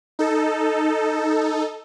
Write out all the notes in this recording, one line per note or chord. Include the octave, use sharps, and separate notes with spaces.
D#4 A4